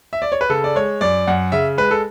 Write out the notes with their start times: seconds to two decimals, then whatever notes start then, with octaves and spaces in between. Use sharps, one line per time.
0.13 E5
0.22 D5
0.32 C#5
0.41 B4
0.49 C#3 A4
0.64 D5
0.76 G#3 C#5
1.01 F#2 D5
1.27 F#2 F#5
1.52 C#3 E5
1.78 G#3 B4
1.91 A4